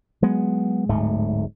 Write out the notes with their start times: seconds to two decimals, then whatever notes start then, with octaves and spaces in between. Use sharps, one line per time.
0.22 F#3 G#3 B3
0.89 D1 G#2 A3